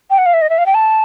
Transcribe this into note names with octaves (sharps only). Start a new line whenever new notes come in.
G5
F#5
F5
E5
D#5
E5
F5
G5
A5